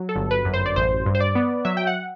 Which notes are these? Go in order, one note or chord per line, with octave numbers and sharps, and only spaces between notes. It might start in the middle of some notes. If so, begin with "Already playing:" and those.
Already playing: F#3
A4
G1
B4
F#2
C5
D5
A1 C5
G2
C5
D5
B3
F#3 E5
G5
F#5